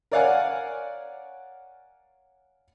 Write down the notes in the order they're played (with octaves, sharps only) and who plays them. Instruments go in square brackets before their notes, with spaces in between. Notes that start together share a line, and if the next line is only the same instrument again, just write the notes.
[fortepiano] A#4 C#5 D5 F5 F#5 G#5